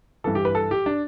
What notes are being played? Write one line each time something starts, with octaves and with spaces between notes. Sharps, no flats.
G2 E3 A4
G4
B4
A4
G4
D4